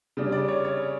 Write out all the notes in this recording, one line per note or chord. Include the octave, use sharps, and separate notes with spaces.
C#3 G3 D4
D5
C#5
C#5